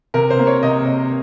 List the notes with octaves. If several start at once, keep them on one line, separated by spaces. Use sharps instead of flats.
C3 A#4
C5
A#3
C#5
C3 D#5
C3